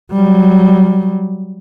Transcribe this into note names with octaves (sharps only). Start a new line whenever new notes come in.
F#3 G3